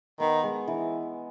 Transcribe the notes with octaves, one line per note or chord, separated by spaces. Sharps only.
D#3 B3
G#3
E3